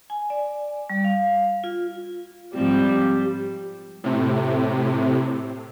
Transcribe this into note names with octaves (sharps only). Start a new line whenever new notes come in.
G#5
D5
G3
F5
F4
G#2 F3 G3 C4
A2 C3